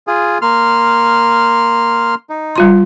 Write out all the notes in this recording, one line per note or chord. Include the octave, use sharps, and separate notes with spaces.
F4 G#4
A#3 C6 F6
D#4
G3 F4 C6